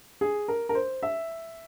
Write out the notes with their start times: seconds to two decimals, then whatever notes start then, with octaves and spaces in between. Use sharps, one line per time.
0.21 G#4
0.48 A#4
0.69 A#4
0.75 C5
1.03 E5